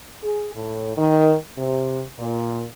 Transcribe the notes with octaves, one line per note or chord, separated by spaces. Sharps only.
G#4
A2
D#3
C3
A#2